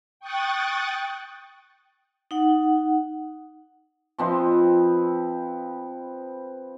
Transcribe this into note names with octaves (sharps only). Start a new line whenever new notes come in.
G5 C#6 D#6 F#6 A6
D#4 F#5
F3 C4 B4 D#5